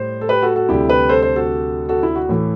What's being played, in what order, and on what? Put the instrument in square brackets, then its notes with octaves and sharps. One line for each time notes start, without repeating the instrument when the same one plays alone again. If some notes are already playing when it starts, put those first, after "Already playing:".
Already playing: [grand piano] A2 G3 C5
A4
G4 B4
F#4 A4
F#4 A4
D2 C3 G3 E4 G4
G4 B4
A4 C5
A4 C5
F#4 A4
F#4 A4
E4
F#4
A2 E3 A3